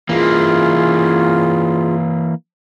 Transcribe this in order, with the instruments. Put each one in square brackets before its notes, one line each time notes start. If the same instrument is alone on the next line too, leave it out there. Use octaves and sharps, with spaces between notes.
[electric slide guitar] E3 A#3 [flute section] C#4 F4 G#4